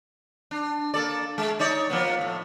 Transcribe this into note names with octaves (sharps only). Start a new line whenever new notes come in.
D4
A#3 A4 D5
G#3
D#4 C#5 D5
F3 A#3 B3
A2